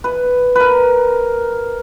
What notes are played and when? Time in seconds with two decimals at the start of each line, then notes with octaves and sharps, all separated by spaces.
0.04 B4
0.55 A#4 B4